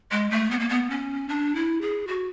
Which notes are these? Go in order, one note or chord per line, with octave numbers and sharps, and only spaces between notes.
G#3
A3
B3
A#3
B3
C#4
D4
E4
G#4
F#4